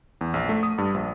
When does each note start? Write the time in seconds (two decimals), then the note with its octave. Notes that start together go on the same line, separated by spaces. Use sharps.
0.21 E2
0.34 A#1
0.49 A3
0.63 D#6
0.78 G2
0.94 A#1